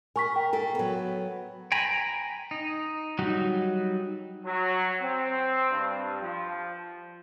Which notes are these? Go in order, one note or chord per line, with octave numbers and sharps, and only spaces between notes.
A#4 G#5 C#6 B6
G5
A#3 A4
F#3 B3
G5 G#5 A#5 B5
D#4
F#3 G3 D#4 F#4
F#3
C4
G2
F3